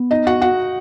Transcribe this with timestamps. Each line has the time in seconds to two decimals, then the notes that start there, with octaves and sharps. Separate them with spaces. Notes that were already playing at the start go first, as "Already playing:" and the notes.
Already playing: B3
0.11 D#4 D#5
0.27 F#4 F#5
0.42 F#4 F#5